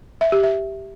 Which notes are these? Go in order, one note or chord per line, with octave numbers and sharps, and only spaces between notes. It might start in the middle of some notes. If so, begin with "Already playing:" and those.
E5
G4
E5